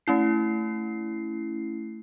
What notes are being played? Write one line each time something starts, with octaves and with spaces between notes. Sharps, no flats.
A3 C#4 E4 C7